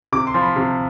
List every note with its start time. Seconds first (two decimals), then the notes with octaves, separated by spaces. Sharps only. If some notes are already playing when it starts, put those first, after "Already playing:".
0.12 C3 D6
0.27 C6
0.34 F3
0.42 B5
0.56 C3